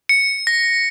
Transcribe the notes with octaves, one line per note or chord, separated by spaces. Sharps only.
C#7
A#6